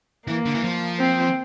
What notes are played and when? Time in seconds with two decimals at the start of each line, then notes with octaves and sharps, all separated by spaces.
0.27 E3 A#3
0.45 D3
0.54 E3
0.63 F3
0.99 C4